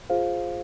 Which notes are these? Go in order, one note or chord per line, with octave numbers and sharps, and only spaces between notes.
F4 G#4 C5 F5